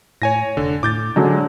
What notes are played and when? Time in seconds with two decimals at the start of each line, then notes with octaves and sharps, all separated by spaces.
0.22 A2 C#5 G#5 A#6
0.57 F1 D3
0.83 A2 D6 G6 A6
1.16 D3 F#3 G#3 C#4 D4